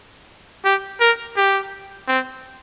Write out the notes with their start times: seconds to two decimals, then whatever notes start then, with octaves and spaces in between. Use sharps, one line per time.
0.64 G4
1.00 A#4
1.37 G4
2.08 C4